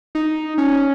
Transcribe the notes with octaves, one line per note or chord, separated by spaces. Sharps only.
D#4
C#4